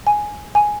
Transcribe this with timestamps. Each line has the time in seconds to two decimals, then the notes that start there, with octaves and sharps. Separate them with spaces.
0.07 G#5
0.55 G#5